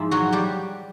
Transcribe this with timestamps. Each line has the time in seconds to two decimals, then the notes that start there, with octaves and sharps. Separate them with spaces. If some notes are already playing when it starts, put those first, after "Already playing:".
Already playing: G#2 F3 G#3 E4
0.11 F#3 F#4
0.32 G3 G4